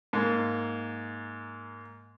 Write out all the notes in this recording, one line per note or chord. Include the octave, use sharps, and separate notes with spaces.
G#2 A#3